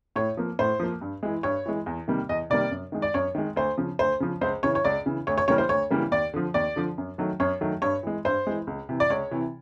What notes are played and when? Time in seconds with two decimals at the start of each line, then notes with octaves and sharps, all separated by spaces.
0.16 A2 C#5
0.37 F3 A#3
0.59 A2 C5
0.80 F3 A#3
1.01 G2
1.23 E3 G#3
1.43 G2 C#5
1.66 E3 G#3
1.86 E2
2.08 C3 D#3 G3 A#3
2.29 E2 D#5
2.50 C3 D#3 G3 A#3 D5
2.71 F#2
2.92 D#3 G#3
3.02 D5
3.14 F#2 C#5
3.35 D#3 G#3
3.56 D2 C5
3.77 C#3 F3
3.99 D2 C5
4.20 C#3 F3
4.41 C#2 C5
4.63 C#3 E3 C#5
4.75 C#5
4.85 C#2 D5
5.06 C#3 E3
5.27 D2 C#5
5.38 C#5
5.48 C#3 E3 G3 A#3 C#5
5.58 C5
5.69 D2 C#5
5.91 C#3 E3 G3 A#3
6.11 D#2 D5
6.34 D3 F3
6.54 D#2 D5
6.76 D3 F3
6.98 F#2
7.18 D#3 F#3 A3
7.40 F#2 C#5
7.61 D#3 F#3 A3
7.82 G2 C#5
8.03 E3 G#3
8.25 G2 C5
8.47 E3 G#3
8.67 C#2
8.89 C3 E3
9.00 D5
9.10 C#2 C#5
9.31 C3 E3